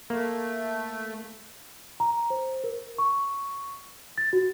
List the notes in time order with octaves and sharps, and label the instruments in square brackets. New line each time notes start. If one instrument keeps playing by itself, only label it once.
[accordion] A3 [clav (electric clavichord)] A#3
[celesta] A#5
C5
A#4
C#6
A6
F#4